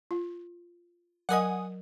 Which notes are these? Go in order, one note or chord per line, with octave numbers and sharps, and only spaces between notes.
F4
F#3 A#4 D#5 F#5 G#5 D#6